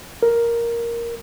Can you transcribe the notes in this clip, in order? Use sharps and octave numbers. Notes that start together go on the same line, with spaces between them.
A#4